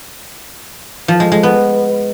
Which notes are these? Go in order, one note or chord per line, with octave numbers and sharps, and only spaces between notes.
F3
G#3
G#3
B3